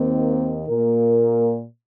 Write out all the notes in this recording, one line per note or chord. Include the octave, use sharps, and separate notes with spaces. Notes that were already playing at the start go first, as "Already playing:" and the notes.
Already playing: D#2 D#3 A#3 C4
A#2 A#3 A#4